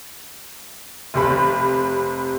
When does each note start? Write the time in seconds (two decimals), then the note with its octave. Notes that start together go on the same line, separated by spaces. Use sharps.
1.14 F1 C3 B5